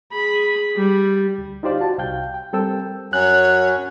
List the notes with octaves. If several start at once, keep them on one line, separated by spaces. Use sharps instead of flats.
G#4 B5
G3
D2
D#4 F4 G4 C5 D5 F5
F#4 A5
C2 F5 G5 G6
G5
G3 C4 A4 A#4 G5 E6
F#2 C#4 C#5 F#6